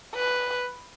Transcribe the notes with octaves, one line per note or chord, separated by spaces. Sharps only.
B4